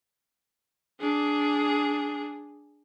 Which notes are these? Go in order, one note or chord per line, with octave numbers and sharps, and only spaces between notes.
D4 G#4